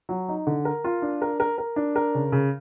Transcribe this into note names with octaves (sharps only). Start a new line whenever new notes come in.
F#3
D#4
D3
A#4
F4
D4
A#4
A#4
A#4
D4
A#4
C#3
C#3